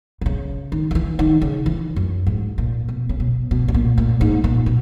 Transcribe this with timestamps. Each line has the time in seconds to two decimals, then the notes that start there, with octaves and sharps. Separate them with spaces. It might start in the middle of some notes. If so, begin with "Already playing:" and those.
0.21 B2
0.26 C#3
0.72 D#3
0.91 D#3
0.95 E3
1.19 D#3
1.42 C#3
1.66 E3
1.96 F#2
2.27 G#2
2.58 A#2
2.88 B2
3.09 C#3
3.20 B2
3.51 B2
3.68 B2
3.74 A#2
3.98 A#2
4.21 G#2
4.44 A#2
4.66 B2